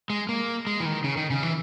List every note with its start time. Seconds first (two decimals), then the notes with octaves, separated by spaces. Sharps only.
0.10 G#3
0.29 A#3
0.67 G#3
0.80 E3
0.86 D#3
1.04 C#3
1.17 D#3
1.31 C#3
1.43 E3